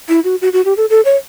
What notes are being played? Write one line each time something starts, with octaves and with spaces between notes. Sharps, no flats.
E4
F#4
F#4
F#4
G4
A4
A4
C#5